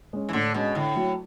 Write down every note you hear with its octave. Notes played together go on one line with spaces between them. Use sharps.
G#3 C#4
E3
A2 D3
B2 G#3 C#4
A2 D3
F#3 A3